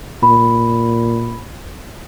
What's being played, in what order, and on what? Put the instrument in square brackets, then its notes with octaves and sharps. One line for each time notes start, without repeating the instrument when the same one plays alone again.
[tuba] A#2 [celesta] B5